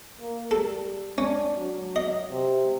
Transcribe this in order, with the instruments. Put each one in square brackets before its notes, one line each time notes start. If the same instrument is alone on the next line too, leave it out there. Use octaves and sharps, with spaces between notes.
[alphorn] A#3
[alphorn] G3 [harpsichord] A4
[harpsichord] C#4 [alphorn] D4
[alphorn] F#3
[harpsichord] D#5
[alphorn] C3